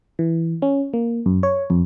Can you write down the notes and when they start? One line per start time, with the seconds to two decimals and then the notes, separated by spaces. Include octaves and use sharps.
0.19 E3
0.62 C#4
0.93 A#3
1.26 F#2
1.43 C#5
1.70 F2